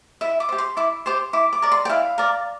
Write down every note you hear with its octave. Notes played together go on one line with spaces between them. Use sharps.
E4 E5
D6
G4 C5
C6
E4 D6
G4 C5 C6
E4 D6
D6
A#4 D5
C6
G5
E4 F5
A#4 D5